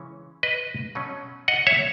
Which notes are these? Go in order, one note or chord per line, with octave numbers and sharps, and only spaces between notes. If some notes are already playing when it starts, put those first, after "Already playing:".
Already playing: C#3 E3 G#3 C#4
B4 D#5
B2 F#3 C#4
D#5 F#5
C#5 E5